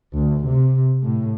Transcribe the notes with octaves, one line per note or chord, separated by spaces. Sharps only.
D2
C3
A2